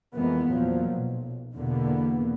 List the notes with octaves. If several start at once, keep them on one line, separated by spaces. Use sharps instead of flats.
F2 E3 G#3 A#3 B3
E2 A#2 F3 F#3
B1
E2 B2 D3 A#3 B3